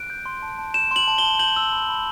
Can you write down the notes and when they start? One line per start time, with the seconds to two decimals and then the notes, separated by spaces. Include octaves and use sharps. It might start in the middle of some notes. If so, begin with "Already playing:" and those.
Already playing: F#6 D7
0.10 G6
0.26 C6
0.42 A5
0.59 A5
0.74 G6 E7
0.91 C6 F#7
1.08 A5
1.18 A5 G7
1.39 G6 F#7
1.56 E6
1.72 B5
1.89 B5